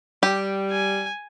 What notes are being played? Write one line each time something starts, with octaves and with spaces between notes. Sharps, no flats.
G3 G4
G#5